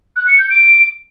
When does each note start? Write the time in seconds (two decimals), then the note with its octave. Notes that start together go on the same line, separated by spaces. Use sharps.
0.16 F#6
0.27 C#7
0.39 G6
0.50 D7